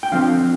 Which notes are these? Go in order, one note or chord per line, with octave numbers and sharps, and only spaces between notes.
G5
D3 F3 C4 F5